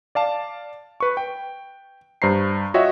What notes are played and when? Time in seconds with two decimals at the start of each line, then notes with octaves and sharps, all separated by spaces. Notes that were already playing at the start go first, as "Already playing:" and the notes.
0.15 D5 F5 A5
1.00 B4 C#6
1.17 G5
2.22 G2 C5 A#5 C7
2.74 F4 F#4 C#5 D#5 E5 G5